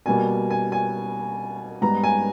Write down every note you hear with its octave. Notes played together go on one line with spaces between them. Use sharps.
B2 G3 A#3 G#5
G#5
G#5
G#2 G3 B3 A#5
G#5